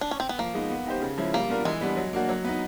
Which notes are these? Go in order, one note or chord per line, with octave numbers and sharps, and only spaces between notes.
D4
C#4
C4
B3
F3 A#3
G#3 B3 D#4
B3
D#4 G4 C5
C#3
F3 G#3 C#4 E4
G3 A#3
B3 D4 F4 A#4
E3 G#3
G3 B3 D4
F#3
A#3 D4 F#4
F#3
B3 D#4